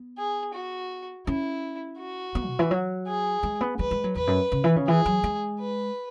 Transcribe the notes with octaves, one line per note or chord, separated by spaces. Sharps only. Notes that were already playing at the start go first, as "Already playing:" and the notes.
Already playing: B3
G#4
F#4
C#4 E4
F#4
B3
B2
E3
F#3
G#4
G#3
B3
G#3 B4
G#3
F#3
E2 B4
F#2
C#3
E3
C#3
E3 G#4
F#3
G#3
B4